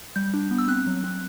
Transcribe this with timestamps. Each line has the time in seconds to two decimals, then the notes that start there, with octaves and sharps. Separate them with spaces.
0.16 G3 G6
0.34 D4
0.51 B3
0.58 E6
0.68 C4 F#6
0.86 F#3
1.04 C4